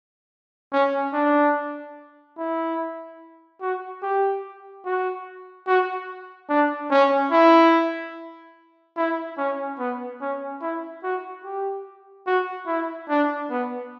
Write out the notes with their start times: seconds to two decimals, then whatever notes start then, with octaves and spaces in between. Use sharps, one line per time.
0.72 C#4
1.13 D4
2.38 E4
3.61 F#4
4.02 G4
4.85 F#4
5.67 F#4
6.49 D4
6.91 C#4
7.32 E4
8.97 E4
9.38 C#4
9.79 B3
10.21 C#4
10.61 E4
11.03 F#4
11.44 G4
12.27 F#4
12.67 E4
13.09 D4
13.50 B3